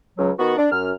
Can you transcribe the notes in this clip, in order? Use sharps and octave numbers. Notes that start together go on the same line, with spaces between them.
C#2 C#3 F#3
D#3 B3 F#4
D4
F#2 F6